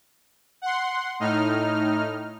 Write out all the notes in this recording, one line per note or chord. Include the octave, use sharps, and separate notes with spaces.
F#5 C6
A2 D#4 F6